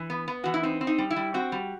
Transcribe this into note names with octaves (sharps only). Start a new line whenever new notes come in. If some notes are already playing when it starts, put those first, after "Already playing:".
Already playing: E3
B3
B3
E3 F#4
E4
C4 D#4
C4
D#4
G3
E4
G3
C4 F#4
G3